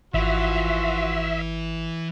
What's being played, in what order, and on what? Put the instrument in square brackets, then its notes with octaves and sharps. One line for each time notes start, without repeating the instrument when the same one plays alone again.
[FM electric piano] G#1 [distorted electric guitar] E3 [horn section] F3 F4 F#4 [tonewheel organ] E5